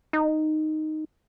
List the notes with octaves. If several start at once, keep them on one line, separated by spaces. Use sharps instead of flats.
D#4